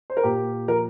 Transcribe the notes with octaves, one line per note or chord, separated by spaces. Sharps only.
C5
A#4
A#2 G4
F3 A#4